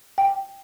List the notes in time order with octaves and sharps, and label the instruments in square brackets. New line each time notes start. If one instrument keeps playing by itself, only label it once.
[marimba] G5